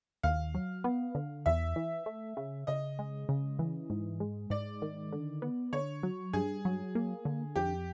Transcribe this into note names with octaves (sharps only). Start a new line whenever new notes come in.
D#2 F5
F#3
B3
D3
E2 E5
E3
A3
C#3
C#3 D#5
G#3
C#3
E3
G#2
G#3
G#2 D5
D#3
D3
B3
D3 C#5
F#3
G2 G#4
F#3
A#3
D3
F2 G4